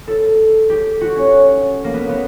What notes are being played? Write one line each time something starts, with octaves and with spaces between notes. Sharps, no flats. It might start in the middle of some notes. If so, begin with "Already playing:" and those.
A4
G4
F#4
C#4
A#3
B3
B3